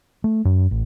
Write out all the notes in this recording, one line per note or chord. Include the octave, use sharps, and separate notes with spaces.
A3
F#2
A1